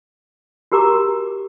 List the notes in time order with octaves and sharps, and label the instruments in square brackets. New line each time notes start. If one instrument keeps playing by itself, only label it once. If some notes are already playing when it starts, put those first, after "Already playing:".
[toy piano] F#4 G4 A#4 A#5 D6